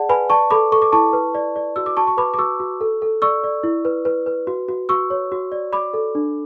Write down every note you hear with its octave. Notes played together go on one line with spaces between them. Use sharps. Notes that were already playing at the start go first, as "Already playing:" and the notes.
Already playing: G#4 D5 F#5 A5
B4 G#5 B5
D5 A5 C#6
A4 B5 D6
A4 C#6
D6
E4 A5 C#6
B4
D5
D5
F#4 E6
D6
F#4 A5 C#6
C#6
B4 B5 D6
D6
F#4 C#6 E6
F#4
A4
A4
D5 C#6 E6
D5
E4
B4
B4
B4
F#4
F#4
F#4 C#6 E6
C#5
F#4
D5
D5 B5 D6
A4
D4